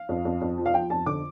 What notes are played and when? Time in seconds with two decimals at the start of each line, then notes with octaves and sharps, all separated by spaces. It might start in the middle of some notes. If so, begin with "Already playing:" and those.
Already playing: F5
0.09 F2
0.25 F2
0.41 F2
0.58 F3
0.66 F5
0.74 F3 G5
0.90 F2 A5
1.06 D3 D6